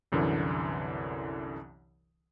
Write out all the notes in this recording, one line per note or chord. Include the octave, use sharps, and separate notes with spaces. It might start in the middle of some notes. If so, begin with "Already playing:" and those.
C2 F#2 D3 E3